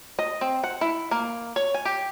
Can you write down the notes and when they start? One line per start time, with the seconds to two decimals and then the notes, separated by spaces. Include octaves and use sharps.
0.19 D#5
0.41 C4
0.64 F#5
0.81 E4
1.11 A#3
1.56 C#5
1.74 G#5
1.85 G4